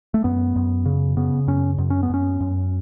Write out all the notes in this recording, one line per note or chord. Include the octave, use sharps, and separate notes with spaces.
A3
F#2 B3
F#2
C#3
C#3 B3
F#2 C#4
F#2
C#4
B3
F#2 C#4
F#2